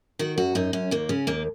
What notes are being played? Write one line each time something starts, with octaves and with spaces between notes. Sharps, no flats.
D#3 F#4
F#2 F#4
F#2 D#4
F#2 C#4
D#2 A#3
C#3 C#4
D#2 A#3